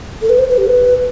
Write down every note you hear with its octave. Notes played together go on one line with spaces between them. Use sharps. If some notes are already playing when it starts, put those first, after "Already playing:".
A4
B4
C5
B4
G4
B4